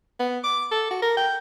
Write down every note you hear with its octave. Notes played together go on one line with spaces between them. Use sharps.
B3
D6
A4
F#4
A#4
G5